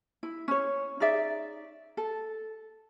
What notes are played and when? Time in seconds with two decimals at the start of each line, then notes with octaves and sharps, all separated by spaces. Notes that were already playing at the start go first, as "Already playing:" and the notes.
0.23 E4
0.48 C#4 C#5
1.00 D#4 G#4 D5 E5
1.97 A4